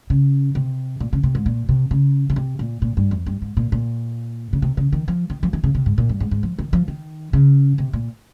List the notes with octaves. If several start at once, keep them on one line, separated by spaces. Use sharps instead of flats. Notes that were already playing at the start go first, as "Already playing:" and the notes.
C#3
C3
A#2
C#3
C3
G#2
A#2
C3
C#3
C#3
C3
A#2
A#2
G2
F2
G2
G#2
A#2
A#2
C#3
C3
C#3
D#3
F3
D#3
F3
D#3
C#3
C3
G#2
A#2
G2
G#2
G#2
F3
D#3
F3
D#3
C#3
C3
A#2